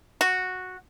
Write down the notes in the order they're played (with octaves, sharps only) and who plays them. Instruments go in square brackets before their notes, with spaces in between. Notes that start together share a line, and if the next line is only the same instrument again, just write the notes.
[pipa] F#4